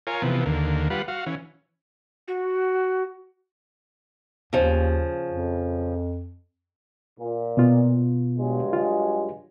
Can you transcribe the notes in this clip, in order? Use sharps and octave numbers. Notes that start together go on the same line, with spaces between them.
F4 A#4 C#5 G#5
C3 E3 F3 B3
D#2 D3 A#3
G3 F4 B4 F#5
F#4 F5
E3 C#4
F#4
D#2 C#3 F3
F2
A#2
B2 B3 F4
G2 F#3 G#3
F4